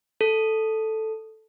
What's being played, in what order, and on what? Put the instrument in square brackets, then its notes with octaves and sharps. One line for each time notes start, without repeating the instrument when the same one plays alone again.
[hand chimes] A4